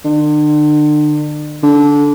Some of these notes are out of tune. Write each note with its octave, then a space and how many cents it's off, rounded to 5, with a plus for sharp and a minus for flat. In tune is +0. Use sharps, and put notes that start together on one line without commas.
D3 +40
D3 -20